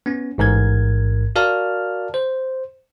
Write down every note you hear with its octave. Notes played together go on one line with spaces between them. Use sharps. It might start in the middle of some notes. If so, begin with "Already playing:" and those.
B3 C#4
A1 G#2 A#4 G#6
F#4 A#4 D5 F5 A5 F6
C5